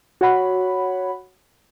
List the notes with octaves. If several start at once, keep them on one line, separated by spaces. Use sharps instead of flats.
F#4 C#5 F#5 B5